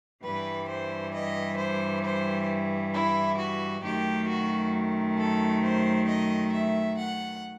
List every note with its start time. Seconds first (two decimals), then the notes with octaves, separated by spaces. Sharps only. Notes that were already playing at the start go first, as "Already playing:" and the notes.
0.24 G2 E3 G3 B4
0.68 C5
1.14 D#5
1.58 C5
2.04 C5
2.93 E4
3.38 F#4
3.83 F#2 D#3 A3 G4
4.28 F#4
5.18 A4
5.63 C5
6.08 D#5
6.53 E5
6.98 F#5